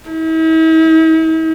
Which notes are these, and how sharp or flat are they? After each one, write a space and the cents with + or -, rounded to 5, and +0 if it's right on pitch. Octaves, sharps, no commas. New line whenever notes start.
E4 -45